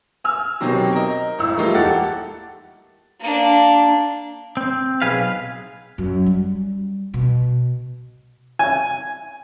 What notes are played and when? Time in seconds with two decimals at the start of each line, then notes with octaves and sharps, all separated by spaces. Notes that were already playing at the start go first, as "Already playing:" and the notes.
0.24 G#5 E6 F6
0.60 B2 D#3 F#3 C4 G4
0.92 A#4 D#5
1.39 G#1 A2 E6
1.57 E3 G3 A3 A#3 D#4 F4
1.74 E1 G4 A4 F#5 A6
3.20 A#3 D4
4.57 C4
5.02 B1 G#4 B4 F5
5.98 F#2
6.26 G3
7.14 B2
8.59 G#5